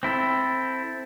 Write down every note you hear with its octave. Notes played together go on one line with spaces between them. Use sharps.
C4 E4 A4